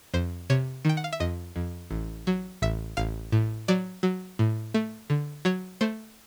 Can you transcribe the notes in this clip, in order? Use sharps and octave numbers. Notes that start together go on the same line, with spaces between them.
F2 C5
C3 C#5
D#3 G5
F#5
F5
E5
F2 D#5
F2
A1
F#3
A1 E5
A1 F5
A2
F#3 D5
F#3
A2
A3
D3
F#3 C#5
A3 C5